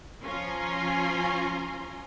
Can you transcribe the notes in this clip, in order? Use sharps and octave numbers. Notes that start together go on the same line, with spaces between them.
F3 C#4 F4 G#5 A#5 C6